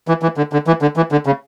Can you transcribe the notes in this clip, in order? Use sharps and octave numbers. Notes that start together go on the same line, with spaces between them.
E3
E3
D3
D3
E3
D3
E3
D3
C#3